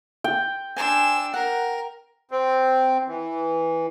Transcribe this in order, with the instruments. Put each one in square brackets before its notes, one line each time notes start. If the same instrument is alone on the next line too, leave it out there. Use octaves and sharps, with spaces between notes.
[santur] G5
[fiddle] D4 E6 [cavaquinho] C5 G#5
[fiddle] A#4 [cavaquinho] F#5
[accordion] C4
E3